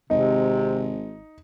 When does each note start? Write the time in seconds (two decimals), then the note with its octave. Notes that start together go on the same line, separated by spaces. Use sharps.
0.10 G#1 C3 D#4